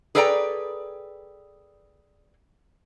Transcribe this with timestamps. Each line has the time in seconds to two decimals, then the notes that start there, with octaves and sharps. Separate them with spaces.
0.15 G#4 A4 B4 D5 G5 A#5